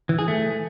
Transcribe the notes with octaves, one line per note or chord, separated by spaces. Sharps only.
E3
G#4
A3